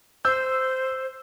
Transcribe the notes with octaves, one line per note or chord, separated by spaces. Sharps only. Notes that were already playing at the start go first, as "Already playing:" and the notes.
C5 E6 G6